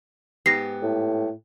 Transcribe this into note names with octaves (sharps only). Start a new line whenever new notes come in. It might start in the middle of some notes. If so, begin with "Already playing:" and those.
G#2 B3 G4 A#6 C7
A2